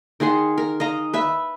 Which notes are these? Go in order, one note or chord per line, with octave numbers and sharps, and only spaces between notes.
D#3 G#4 F#5 C6
A#4
D#5 F5 A#5
B4 E5 B5